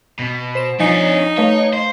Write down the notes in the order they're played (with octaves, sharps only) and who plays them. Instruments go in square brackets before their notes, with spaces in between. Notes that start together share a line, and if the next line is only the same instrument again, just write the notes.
[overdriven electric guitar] B2
[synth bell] C5 E7
[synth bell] F3 G#5 C#7 [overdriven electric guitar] D4 C#5 [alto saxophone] D#4
[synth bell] A3 B4 F5 [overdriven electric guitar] C#5
[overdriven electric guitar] C5